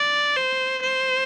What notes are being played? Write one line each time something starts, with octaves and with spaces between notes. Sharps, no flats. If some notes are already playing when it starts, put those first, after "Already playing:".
Already playing: D5
C5
C5